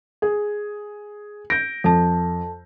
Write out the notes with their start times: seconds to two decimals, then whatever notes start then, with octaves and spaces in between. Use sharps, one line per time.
0.22 G#4
1.50 G6 A#6 D7
1.84 F2 A4 A5